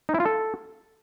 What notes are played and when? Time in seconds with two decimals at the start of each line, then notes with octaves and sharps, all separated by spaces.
0.09 D#4
0.14 E4
0.20 F4
0.25 A4